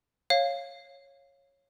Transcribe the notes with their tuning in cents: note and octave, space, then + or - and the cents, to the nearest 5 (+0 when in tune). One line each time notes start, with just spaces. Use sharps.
C#5 -10 F5 +0